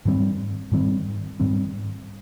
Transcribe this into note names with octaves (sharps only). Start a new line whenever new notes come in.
G#2 D#3 G3 C4
G#2 D#3 G3 C4
G#2 D#3 G3 C4